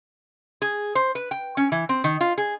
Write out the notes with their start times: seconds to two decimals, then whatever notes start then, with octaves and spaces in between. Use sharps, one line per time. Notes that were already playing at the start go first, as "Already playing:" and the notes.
0.62 G#4
0.95 C5
1.15 B4
1.31 G5
1.57 C#4
1.72 E3
1.89 C4
2.04 D#3
2.21 F4
2.38 G#4